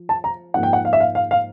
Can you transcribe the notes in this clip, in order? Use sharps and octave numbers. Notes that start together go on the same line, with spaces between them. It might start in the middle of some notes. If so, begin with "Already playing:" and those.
Already playing: F3
A5
A#5
G#2 F3 A#3 F#5
G5
F#5
F5
E5
F5
F5
F5